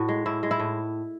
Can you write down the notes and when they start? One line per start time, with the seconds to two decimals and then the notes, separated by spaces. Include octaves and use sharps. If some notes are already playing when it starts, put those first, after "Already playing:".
Already playing: A2 F#4
0.09 G#3
0.26 A2 E4
0.43 G#3
0.51 E4
0.60 A2